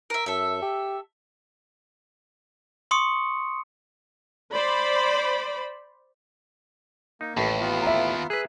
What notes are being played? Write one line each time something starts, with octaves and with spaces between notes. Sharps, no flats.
A#4 E5
F#2 A4 E5
G4
C6 C#6 D#6 C#7
C5 D5 B5
A#3 D#4
A1 D#2 A2
B3 F4
E5 A#5
G#4 B4 E6 F#6